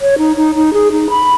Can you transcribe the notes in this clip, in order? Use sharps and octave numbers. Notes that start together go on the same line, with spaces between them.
C#5
D#4
D#4
D#4
G#4
D#4
B5